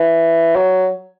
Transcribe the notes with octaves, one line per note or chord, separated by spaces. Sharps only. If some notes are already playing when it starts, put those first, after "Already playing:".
Already playing: E3
F#3